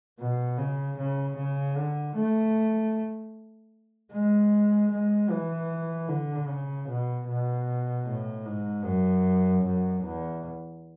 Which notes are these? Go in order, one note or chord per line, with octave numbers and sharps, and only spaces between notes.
B2
C#3
C#3
C#3
D3
A3
G#3
G#3
E3
D3
C#3
B2
B2
A2
G#2
F#2
F#2
E2